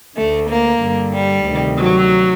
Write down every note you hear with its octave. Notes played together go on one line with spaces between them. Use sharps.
D2 D3 A3
A#3
G2 D3
G3
D2 C3 D#3
F#3